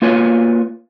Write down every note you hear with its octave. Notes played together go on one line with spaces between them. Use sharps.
A#3 F4 B4 C#5 G#5